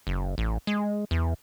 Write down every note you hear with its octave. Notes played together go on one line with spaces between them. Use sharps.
F#1
A1
G#3
E2